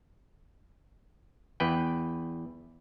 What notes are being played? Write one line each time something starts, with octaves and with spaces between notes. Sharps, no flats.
E2 B4 G5